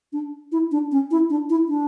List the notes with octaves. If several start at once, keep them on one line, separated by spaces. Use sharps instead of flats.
D4
E4
D4
C#4
E4
D4
E4
D4